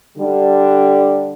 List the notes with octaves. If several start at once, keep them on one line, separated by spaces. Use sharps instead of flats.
D3 G3 D4